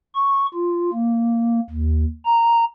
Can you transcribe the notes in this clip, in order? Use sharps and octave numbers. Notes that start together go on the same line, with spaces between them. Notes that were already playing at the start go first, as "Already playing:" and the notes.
C#6
F4
A#3
D#2
A#5